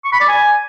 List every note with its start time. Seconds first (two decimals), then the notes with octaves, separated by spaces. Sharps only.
0.05 C#6
0.13 B5
0.20 D5
0.28 G#5